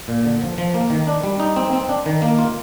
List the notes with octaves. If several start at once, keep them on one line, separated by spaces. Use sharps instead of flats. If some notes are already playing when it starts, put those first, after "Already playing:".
A#2
D3
F3
F3
A#3
D#3
D4
G3
D#4
C4
C4
D4
D#3
A#3
F4